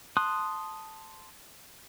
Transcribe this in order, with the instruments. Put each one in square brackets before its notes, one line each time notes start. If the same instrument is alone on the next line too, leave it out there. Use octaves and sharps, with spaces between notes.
[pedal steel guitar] A5 C6 D#6 F#6